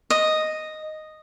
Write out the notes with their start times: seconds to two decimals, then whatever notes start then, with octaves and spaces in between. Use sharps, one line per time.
0.10 D#5